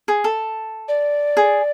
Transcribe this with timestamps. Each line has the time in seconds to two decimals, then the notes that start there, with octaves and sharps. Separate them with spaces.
0.08 G#4
0.24 A4
0.88 D5
1.37 G#4